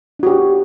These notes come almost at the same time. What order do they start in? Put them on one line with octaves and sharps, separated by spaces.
D4 F#4 G4